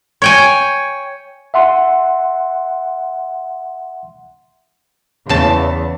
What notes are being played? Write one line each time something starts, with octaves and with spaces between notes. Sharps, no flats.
C#5 G5 G#5
E5 F#5 C6
E2 C#3 A5